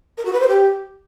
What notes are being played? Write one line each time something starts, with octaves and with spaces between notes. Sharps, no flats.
A#4
F#4
B4
C5
G4